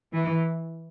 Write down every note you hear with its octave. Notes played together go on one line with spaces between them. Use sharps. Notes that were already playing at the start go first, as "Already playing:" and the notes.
E3